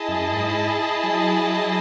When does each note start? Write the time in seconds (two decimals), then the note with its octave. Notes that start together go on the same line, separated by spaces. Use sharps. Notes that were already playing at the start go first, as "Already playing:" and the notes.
Already playing: E4 G#4 D#5 A5
0.09 F#2
0.32 G#2
1.04 F#3